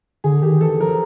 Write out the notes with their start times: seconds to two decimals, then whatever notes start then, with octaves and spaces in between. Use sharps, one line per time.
0.24 D3 G#4
0.42 D#3 G4
0.61 E3 A4
0.80 F3 A#4